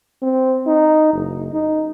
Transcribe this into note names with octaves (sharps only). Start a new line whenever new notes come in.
C4
D#4
F#1
D#4